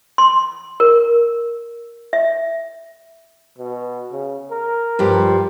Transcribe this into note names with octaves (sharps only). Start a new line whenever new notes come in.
C6
A#4
E5
B2
C#3
A#4
G2 F3 G4